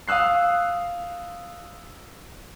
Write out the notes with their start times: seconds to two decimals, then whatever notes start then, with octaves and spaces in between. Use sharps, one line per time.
0.08 F5 D#6 E6 F#6 C7